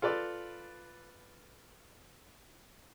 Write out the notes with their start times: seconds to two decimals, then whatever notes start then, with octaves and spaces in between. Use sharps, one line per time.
0.02 F4 A4 B4 D5